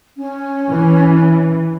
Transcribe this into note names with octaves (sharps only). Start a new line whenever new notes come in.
C#4
E3